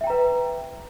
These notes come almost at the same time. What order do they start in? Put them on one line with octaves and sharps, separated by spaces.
E5 G5 A#5 B4